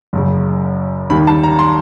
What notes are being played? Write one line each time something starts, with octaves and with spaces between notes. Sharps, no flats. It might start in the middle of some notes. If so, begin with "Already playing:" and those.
F#1 F#2 C#3
D#2 D#3 G3 B5
A5
A#5
C6